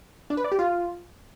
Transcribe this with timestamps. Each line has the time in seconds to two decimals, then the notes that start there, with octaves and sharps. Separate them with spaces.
0.30 D4
0.37 B4
0.44 D5
0.52 G4
0.59 F4